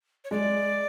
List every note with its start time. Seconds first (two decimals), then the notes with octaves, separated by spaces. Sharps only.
0.24 C#5
0.31 G#3 D5